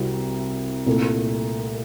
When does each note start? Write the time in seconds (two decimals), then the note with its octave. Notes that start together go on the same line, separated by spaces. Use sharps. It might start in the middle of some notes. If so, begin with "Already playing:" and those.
Already playing: C2 C3 G3 C4 F#4
0.87 C2 A#2 A3